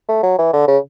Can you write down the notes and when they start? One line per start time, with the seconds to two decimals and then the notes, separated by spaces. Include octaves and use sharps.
0.09 A3
0.23 F#3
0.38 E3
0.53 D3
0.67 C#3